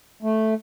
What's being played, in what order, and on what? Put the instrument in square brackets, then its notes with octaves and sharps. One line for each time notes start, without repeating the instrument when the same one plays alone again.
[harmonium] A3